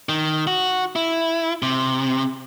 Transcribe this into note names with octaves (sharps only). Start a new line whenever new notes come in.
D#3
F#4
E4
C3